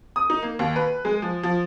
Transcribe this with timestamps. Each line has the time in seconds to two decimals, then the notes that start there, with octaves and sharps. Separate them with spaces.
0.16 D#6
0.30 D#4
0.42 A#3
0.59 D#2
0.76 B4
1.05 G#3
1.22 F3
1.43 F3